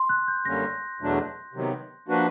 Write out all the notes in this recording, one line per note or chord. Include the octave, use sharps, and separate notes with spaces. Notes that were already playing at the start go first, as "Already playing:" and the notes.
Already playing: C6
F#6
G6
F#2 D3 G3 A#3 C#4 A#6
E2 B2 F#3 A3 D4
C3 D#3 F#3 B3
F3 A#3 D4 F#4 B4